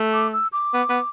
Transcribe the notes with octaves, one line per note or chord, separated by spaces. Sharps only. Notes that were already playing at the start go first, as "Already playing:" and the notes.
Already playing: A3
D6
E6
D6
B3
B3